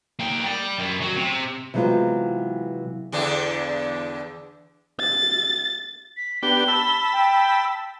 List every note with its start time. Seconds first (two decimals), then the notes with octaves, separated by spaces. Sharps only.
0.20 A#3 G5
0.45 D5 G5
0.79 F#2
1.01 F#3 F#4
1.17 C3
1.74 C3 E3 F#3 G#3 B3 F4
3.12 E2 D3 D4
5.00 A6
6.17 B6
6.43 B3 D4 G4 G7
6.68 A5 B5 E6
7.13 G5